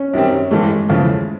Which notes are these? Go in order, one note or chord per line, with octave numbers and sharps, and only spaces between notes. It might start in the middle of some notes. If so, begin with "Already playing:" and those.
Already playing: C#4
F#2 D#3 G3 C4
G2 E3 G#3 A3
E2 C#3 F3 A3